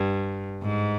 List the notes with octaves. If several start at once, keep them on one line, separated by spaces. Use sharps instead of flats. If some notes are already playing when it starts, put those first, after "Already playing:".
Already playing: G2
G#2